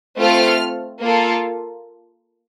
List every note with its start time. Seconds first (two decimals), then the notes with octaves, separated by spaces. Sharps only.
0.21 A3 C4 F4 A4 F6
1.03 A#3 F4 A4